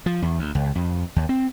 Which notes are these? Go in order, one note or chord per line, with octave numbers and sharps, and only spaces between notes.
F3
E2
D2
C#2
F2
D#2
C4